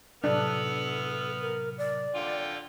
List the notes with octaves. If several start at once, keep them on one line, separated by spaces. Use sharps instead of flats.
A2 C3 F#3 B3 D4 A4 F#5 F6
A#4
D5
D3 F4 G5